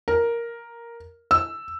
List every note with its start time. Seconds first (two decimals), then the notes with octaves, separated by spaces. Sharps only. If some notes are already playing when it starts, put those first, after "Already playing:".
0.08 A#4
1.31 E6